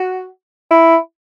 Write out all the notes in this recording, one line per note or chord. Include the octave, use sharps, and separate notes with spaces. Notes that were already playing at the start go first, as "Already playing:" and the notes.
Already playing: F#4
E4